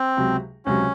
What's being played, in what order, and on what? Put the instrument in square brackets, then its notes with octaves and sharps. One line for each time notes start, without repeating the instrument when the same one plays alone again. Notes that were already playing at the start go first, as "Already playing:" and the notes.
Already playing: [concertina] C4
[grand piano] C#2 C3 F#3
[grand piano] C#2 C3 F#3 [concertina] C#4